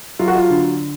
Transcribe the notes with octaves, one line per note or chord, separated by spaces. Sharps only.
F#3 F4
F#4
F4
D3